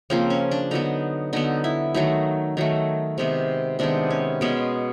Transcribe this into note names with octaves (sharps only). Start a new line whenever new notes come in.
C#3 F3 A#3 C4
C#4
D4
D3 F#3 B3 D#4
D3 F#3 B3 D#4
E4
D#3 F#3 A3 D#4
D#3 F#3 A3
C3 D#3 G#3 B3
C3 D#3 G#3 B3 D4
C#4
B2 G#3 B3 C#4